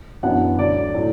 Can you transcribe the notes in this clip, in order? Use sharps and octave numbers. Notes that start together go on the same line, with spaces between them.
F#2 E3 B3 D4 F#5
D2 D3 F#3 D5
A2 F#3 A3